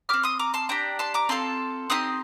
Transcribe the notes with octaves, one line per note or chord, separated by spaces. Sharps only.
C4 G4 D6 F6
C6 D#6
A#5 D6
A5 C6
D4 G4 G5 A#5
A5 C6
A#5 D6
C4 F4 A4 A5 C6
C4 D#4 G4 C6 D#6